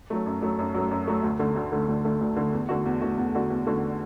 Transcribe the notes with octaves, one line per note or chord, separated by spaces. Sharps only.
F#3 A3
F#2
F#3 A3
F#2
F#3 A3
F#2
F#3 A3
D2
D3 A3
D2
D3 A3
D2
D3 A3
D2
D3 A3
E2
D3 A3 F#4
E2
D3 A3 F#4
E2
D3 A3 F#4
E2
D3 A3 F#4